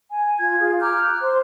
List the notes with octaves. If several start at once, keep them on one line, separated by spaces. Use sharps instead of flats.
G#5
F4 G#6
F4 G#4
A#5 D6 F6 G6
F#6
C5 C6